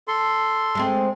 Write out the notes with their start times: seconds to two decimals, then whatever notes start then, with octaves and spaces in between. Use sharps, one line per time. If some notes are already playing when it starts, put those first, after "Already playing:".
0.08 A4 C6
0.75 G#3 A3 C4